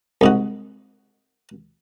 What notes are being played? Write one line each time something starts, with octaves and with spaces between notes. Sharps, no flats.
C2 G#2 F#4